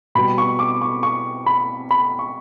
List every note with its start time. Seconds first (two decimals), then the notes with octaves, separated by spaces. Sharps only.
0.15 B2 G3 B3 B5
0.38 C#6
0.59 D6
0.81 C#6
1.03 C#6
1.46 B5
1.91 B5
2.19 C#6